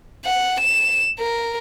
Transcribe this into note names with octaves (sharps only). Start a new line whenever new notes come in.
F#5
E7
A#4